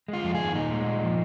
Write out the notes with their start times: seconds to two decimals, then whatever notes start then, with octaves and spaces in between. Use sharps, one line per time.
0.08 G#3 F4
0.24 F2
0.35 G#4
0.40 D#3
0.55 A#2 D#4
0.71 G#3
0.86 A#2
1.03 F3